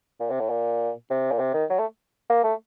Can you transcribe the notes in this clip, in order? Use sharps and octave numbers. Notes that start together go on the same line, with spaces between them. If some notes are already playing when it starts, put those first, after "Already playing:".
A#2
C3
A2
A#2
C3
A#2
C3
D#3
F#3
A3
A#3
A3